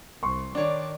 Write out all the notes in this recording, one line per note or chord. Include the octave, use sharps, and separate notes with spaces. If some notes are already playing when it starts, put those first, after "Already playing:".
C2 C6 C#6
D#3 D4 C#5 D5